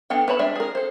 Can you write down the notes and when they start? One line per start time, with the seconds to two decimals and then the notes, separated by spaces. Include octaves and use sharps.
0.10 B3 D4 A4 G5
0.28 B4 C#5 A5 B5
0.39 G#3 D4 D5 E5
0.56 G#4 A#4
0.75 A4 C5